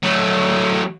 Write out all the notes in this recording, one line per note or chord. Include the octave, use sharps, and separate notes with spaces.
F#3 A3